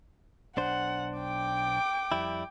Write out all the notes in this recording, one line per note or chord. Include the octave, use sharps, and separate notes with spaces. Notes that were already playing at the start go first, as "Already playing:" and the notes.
B1 D4 C5 F#5
G5 D6
F2 G3 E4